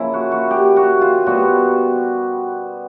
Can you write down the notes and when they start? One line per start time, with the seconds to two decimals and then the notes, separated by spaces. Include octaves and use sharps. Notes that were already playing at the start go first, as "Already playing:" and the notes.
Already playing: C#3 F3 A#3 E4
0.14 F#4
0.32 F#4
0.51 G4
0.76 F#4
1.01 F4
1.26 B2 G3 B3 F#4